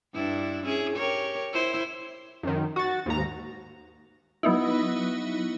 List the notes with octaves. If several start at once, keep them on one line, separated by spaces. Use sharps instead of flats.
G2 D4 E4
C#4 E4 G#4
G4 A#4 C#5
E4 C5
F#2 D#3
F#4 A6
D#2 G#2 A#5
F#3 B3 D#4 E4